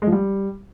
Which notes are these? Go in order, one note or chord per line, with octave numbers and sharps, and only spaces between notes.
G#3
F3
G3